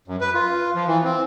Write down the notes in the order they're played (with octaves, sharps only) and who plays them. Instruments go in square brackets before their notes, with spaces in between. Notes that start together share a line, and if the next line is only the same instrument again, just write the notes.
[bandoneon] F#2
B4
F4
F3
E3
C4